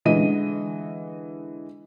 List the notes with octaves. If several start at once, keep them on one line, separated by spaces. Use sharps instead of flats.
D3 E3 G#3 D#5 D#7